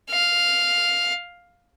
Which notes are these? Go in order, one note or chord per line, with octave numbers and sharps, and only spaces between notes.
F5